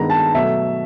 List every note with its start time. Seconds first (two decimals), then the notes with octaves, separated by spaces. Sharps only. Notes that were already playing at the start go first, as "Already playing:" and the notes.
Already playing: G2 D#3 G#3 B3 A#5
0.10 A5
0.34 B2 F#3 A3 E5